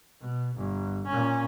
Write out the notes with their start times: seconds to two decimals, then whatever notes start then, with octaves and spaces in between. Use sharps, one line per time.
0.21 B2
0.57 G1
1.07 A#2 C#4